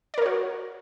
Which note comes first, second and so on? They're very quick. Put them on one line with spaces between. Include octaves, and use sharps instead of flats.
D5 A#4 C#5 F#4